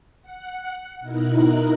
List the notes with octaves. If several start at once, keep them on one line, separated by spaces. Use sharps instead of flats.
F#5
B2 D#4 E4 A#4 F#6